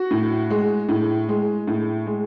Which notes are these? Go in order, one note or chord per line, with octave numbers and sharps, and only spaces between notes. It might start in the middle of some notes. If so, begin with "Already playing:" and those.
Already playing: F#4
A2
G#3
A2
G#3
A2
G#3